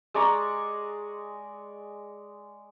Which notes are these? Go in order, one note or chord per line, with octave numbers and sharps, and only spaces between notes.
G#3 D5 A#5 C#6